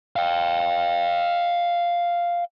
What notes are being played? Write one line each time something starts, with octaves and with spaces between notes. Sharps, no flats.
F5 G5